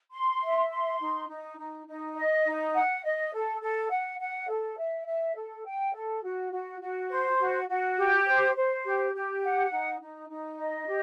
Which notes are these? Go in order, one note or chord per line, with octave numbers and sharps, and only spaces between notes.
C6
E5
C6
D#4
D#4
D#4
D#4
D#5
D#4
F#5
D#5
A4
A4
F#5
F#5
A4
E5
E5
A4
G5
A4
F#4
F#4
F#4
C5
F#4
F#4
G4
C5
C5
G4
G4
F#5
D#4
D#4
D#4
D#5
G4